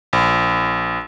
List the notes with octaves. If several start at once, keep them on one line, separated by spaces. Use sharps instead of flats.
A#1